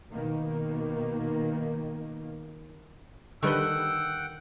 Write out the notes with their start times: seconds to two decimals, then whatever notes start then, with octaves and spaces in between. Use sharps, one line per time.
0.11 B2 D#3 A#3
3.43 D3 D#3 G3 B4 D#5 F#5 G5 E6